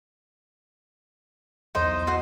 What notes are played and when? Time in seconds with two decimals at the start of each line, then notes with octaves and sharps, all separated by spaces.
1.75 B1 E2 D#4 C5 D#5
2.07 F#4 C5 D#5